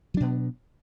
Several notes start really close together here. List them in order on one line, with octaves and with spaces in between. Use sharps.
F#3 D4 B2 B3